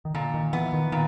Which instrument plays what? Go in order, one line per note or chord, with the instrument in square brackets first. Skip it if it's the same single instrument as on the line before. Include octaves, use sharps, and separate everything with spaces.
[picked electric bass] D#3
[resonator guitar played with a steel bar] A#2 [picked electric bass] D3
[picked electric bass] D#3
[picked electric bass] E3 [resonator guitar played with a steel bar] B3
[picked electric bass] D#3
[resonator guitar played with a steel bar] A#2 [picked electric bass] D#3